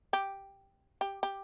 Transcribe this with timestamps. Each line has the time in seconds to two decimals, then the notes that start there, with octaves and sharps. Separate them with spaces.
0.13 G4
1.01 G4
1.23 G4